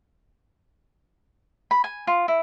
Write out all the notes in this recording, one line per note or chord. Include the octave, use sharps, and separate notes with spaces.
B5
G#5
F4
E4